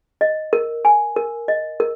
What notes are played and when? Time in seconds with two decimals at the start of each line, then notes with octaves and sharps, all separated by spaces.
0.21 D#5
0.53 A#4
0.85 G#5
1.16 A#4
1.48 D#5
1.80 A#4